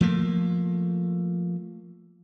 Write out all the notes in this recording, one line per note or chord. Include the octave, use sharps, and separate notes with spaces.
F3 A3 A#3